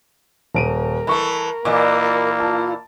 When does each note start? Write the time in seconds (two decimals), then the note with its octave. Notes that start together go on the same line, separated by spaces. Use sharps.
0.54 D#1 A#4 D7 D#7
1.07 E3 A3 B5 C#6
1.65 A#2 E3 A#3 D#5 G#5 D6
2.40 F4 A5